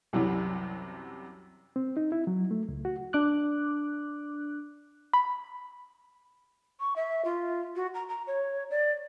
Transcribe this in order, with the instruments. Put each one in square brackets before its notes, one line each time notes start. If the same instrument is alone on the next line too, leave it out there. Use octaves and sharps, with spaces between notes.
[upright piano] C2 F#2 C3 E3 F#3 G3
[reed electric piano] C4
D#4
E4
F#3
A3
C#2
F#4
[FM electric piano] D4 D6 F#6
[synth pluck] B5
[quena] C#6
E5
F4
F#4
A#5
A#5
C#5
D5